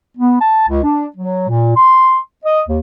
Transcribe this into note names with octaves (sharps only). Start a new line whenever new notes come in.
B3
A5
C#2
D4
F#3
A#2
C6
D#5
D#2